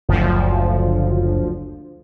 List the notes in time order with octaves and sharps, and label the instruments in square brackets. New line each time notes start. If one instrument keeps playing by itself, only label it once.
[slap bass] F#1 [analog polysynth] D2 F3